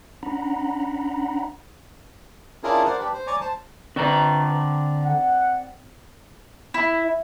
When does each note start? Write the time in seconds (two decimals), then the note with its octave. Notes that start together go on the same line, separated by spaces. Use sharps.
0.23 C#4 D4 F#5 A#5 B5
2.64 C#4 D4 E4 F4 G#4 A#4
2.85 A#4 C5 D5 F#5
2.99 D4 G4 B4
3.14 C5
3.27 C#5 D5 G#5 A#5 C#6 D6
3.41 C5 A5
3.96 D3 C4 D5 A#5
5.04 F#5
6.74 E4